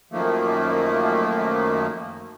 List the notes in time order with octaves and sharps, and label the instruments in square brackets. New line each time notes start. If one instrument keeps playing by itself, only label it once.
[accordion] F#2 D#3 F3 A3 A#3